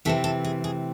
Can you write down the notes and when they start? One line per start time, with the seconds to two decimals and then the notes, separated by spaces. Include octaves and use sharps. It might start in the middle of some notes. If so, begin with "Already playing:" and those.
0.05 C3 E3 A3 C4 A4
0.24 A4
0.45 G#4
0.64 G#4